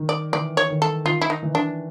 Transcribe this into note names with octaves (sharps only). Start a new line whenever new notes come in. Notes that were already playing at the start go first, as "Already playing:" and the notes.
Already playing: D#3
D5
E3 D5
C#5
D#3
A4
D#3 F4
E4
D#4
E3
D4